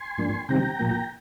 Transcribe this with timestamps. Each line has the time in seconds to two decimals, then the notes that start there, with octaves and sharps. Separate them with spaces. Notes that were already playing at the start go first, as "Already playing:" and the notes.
Already playing: G#5 C6
0.18 G#2 F3 A#3 D4
0.49 C3 D#3 G3 C4 G5 A#5
0.79 A#2 F3 A#3